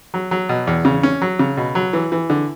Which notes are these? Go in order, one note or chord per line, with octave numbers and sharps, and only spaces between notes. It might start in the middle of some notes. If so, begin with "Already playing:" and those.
F#3
F#3
B2
E2
C#3
C#4
F#3
C#3
B2
F#3
E3
E3
D3